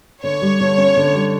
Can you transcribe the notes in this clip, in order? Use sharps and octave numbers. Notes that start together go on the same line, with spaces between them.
D3 C#5
G3
D3
C#4
D3
G3